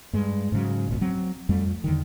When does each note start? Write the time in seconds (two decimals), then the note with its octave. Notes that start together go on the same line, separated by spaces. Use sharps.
0.13 G2 G#3
0.52 G#2 C#3 F#3
0.88 D#1 G#1 C#2 B2
1.01 F#3 C4
1.49 F2 G3 A3
1.84 E2 D3 D#3